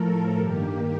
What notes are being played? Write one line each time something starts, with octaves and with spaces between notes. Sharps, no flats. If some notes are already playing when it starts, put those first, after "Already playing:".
Already playing: A2 F3 A3 A4 A#4
G2 D#3 A#3 G4